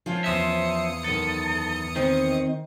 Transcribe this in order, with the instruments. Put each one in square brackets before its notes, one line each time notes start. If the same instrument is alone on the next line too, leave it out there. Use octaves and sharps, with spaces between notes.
[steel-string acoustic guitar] F3 C#4 F4
[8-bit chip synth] E2 D#6 C#7 [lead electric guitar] C5 E5
[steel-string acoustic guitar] F#2 D#3 [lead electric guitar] A4
[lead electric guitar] D#3 [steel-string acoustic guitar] C4